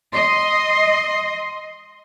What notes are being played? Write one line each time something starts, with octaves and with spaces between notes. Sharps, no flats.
D#5 C6